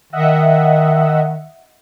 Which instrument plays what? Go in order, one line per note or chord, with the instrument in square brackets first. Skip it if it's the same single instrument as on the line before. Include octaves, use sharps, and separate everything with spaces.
[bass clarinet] D#3 [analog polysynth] D#5 E5 F#5